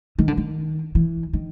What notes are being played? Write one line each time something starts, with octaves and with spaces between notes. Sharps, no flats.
D#3
D3
D#3
E3
D#3